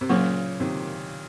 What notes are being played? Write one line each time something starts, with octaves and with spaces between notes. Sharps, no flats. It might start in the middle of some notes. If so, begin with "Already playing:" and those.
C3
A#2 C#3 F#3 A#3 C#4
C3 D#3